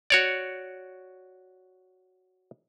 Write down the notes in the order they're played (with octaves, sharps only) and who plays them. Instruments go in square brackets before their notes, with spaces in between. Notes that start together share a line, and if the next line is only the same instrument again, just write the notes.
[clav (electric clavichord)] F#4 C#5 D5